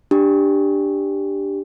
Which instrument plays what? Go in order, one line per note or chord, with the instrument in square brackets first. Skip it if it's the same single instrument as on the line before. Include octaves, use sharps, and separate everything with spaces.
[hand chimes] D4 G4